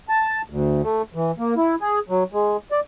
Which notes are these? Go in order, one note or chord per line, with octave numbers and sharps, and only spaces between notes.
A5
D2
A3
E3
A#3
E4
G#4
F#3
G#3
D5